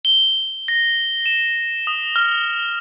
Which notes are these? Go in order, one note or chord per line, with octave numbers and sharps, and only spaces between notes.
G7
A#6
E7
D#6
F6